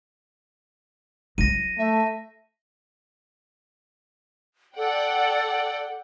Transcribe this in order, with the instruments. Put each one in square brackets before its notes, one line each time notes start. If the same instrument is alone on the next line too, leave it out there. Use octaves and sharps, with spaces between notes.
[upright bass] F#3 E4 [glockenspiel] A#6 D#7
[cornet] A3 [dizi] E5
[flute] A4 [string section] D5 F#5 G5